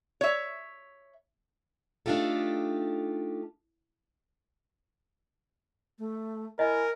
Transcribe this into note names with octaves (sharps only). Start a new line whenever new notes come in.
C#5 E5
A3 D4 D#4 F4 G4 A4
A3
E4 A#4 D#5 G#5